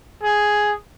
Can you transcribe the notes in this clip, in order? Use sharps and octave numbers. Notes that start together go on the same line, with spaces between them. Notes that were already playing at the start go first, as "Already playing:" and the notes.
G#4